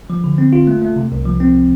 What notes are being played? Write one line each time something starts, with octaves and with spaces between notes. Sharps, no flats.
F3
D3
C4
F4
A3
A3
C3
C2
F3
C4